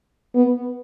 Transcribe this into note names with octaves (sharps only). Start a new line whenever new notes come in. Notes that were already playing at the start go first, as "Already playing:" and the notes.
B3